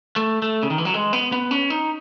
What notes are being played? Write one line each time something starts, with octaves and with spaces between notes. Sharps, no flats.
A3
A3
C#3
D#3
E3
F#3
G#3
B3
B3
C#4
D#4